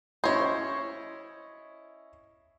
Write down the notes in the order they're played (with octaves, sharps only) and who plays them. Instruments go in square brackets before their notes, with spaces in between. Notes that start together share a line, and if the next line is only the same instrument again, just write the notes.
[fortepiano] C#4 E4 D#5 [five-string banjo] C5 C#5